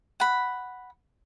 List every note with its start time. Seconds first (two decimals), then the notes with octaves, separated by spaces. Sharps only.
0.20 F#5 B5